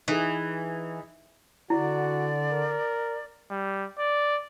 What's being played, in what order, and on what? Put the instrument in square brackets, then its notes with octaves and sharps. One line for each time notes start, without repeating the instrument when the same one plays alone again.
[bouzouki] E3 [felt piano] D#4 E4 G#4
[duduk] D3 [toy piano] E4 [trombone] F#4 [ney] D5
[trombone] A#4
[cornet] G3
D5